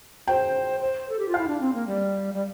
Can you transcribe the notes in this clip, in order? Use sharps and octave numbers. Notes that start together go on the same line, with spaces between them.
C5 G5
C5
A4
G4
F4
E4 F5
D4
C4
A#3
G3
G3